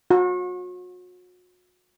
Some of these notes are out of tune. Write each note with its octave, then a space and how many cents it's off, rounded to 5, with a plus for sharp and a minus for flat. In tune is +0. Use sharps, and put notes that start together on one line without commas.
F#4 -40